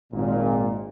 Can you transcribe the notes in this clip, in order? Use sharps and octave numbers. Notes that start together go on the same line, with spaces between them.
G#1 A#2